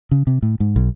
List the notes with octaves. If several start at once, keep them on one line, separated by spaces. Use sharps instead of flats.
C#3
C3
A2
G#2
B1